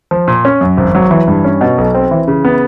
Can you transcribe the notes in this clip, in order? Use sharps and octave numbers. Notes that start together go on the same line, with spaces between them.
F3
A#2
C#4
F#2
G#1
F#3
E3
G2
C#4
B2
B1
C4
E3
C#3
B3